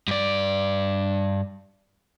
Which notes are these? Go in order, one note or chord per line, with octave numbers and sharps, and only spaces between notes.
G2 D5